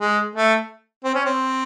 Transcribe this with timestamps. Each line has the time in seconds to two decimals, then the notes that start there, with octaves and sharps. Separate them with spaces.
0.01 G#3
0.35 A3
1.04 C4
1.15 C#4
1.25 C4